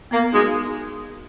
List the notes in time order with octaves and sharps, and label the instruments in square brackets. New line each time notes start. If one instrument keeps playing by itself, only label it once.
[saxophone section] A#3 [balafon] B3
[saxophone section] G#3 [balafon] D#4 F#4 A#4